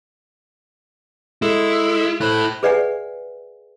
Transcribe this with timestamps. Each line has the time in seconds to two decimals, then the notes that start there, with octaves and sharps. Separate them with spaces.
1.42 G#3 E4 G#4 A4
2.21 E4 A4 C5 B5 F#6
2.63 G#4 B4 D5 E5 F#5 G#5